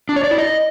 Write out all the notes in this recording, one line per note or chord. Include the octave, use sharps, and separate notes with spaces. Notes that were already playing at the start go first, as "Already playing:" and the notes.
D4
C#5
D5
E4
D#5